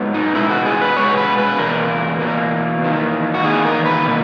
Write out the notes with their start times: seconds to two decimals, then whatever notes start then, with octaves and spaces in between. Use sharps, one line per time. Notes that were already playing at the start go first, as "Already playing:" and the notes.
Already playing: G#2 F#3 B3
0.14 D#4
0.35 B2 G#3 B3 E4
0.50 F#4
0.66 G#4
0.81 B4
0.97 B2 G#3 B3 C#5
1.17 B4
1.38 B4
1.59 E2 B2 A#3 A#4
2.20 E2 B2 A#3
2.82 E2 D#3 A#3
3.34 F#4
3.44 E2 D#3 A#3 G#4
3.65 A#4
3.86 B4
4.06 B2 A#3